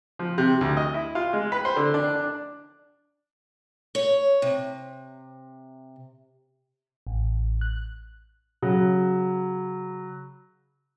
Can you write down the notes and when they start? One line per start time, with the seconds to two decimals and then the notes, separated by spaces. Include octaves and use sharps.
0.19 F3
0.38 C3
0.61 D2
0.77 D#5
0.94 E4
1.15 F4
1.33 G#3
1.52 B4
1.65 C5
1.76 D3
1.94 D4
2.15 D4
3.95 C#5
4.42 C3
7.07 A1
7.61 F#6
8.62 C#3 F#3